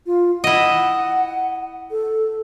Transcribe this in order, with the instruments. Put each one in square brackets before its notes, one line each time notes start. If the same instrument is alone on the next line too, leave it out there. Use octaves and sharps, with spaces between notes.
[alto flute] F4
[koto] E4 D#5 [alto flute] F#5
[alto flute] A4